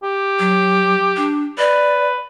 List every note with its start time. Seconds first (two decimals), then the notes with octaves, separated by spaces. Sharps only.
0.03 G4
0.39 F#3
1.17 D4
1.58 B4 D5